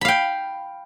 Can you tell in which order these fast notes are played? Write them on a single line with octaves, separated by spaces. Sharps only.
B5 F5 G5